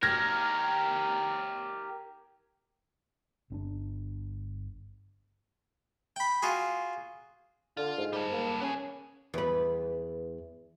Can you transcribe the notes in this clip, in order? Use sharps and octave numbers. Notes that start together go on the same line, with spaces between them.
G4 A#4 F6 G#6 A#6
G1 C4 D4
G5 B5
F4 F#4 G#4
D3 F4
G#2
G3 A4
A#3
B3 C#4 G#4
E2 B4